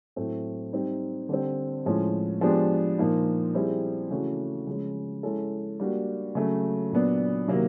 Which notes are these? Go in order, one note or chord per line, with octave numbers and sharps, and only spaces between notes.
A2 F#3 A3 C4
G3 C4 D#4
D3 G3 C4
A2 F3 G#3 C#4
F3 G#3 B3 D4 G4
A#2 F3 A#3 D#4
G3 C4 E4 G#4
C#3 E3 A3 C#4 F#4
C#3 F3 G#3 C#4
G#3 C#4 E4 A4
G3 A#3 D4 F#4
C#3 F#3 A3
A#2 F#3 B3 D4
C3 D#3 F#3 A#3